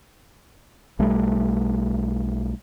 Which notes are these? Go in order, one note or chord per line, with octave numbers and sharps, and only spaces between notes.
B1 G3 A3